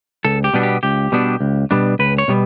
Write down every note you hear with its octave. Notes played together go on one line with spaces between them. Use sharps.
C#2 A4
G4
B2 G3 B3 D4
G4
C#2 G4
B2 G3 B3 D4
C#2
B2 G3 B3 D4
C#2 B4
C#5
B2 G3 B3